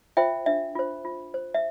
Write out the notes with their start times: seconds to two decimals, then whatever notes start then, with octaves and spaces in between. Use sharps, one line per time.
0.17 F4 C5 E5 G5
0.46 D4 E5
0.75 F4 C5
1.05 F4
1.34 C5
1.54 E5